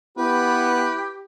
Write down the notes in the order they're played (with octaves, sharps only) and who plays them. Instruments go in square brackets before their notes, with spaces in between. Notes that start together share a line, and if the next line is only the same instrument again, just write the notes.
[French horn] B3 [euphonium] E4 [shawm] G4 [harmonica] B4